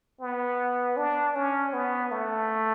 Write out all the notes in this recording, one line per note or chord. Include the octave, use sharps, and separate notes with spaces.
B3
D4
C#4
B3
A3